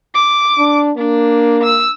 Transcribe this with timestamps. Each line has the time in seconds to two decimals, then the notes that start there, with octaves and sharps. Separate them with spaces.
0.14 D6
0.58 D4
0.97 A#3 D4
1.63 E6